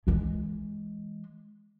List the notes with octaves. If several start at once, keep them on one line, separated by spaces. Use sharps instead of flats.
E3 G#3